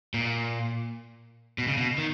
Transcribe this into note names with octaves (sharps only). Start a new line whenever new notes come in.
A#2
B2
C#3
B2
D#3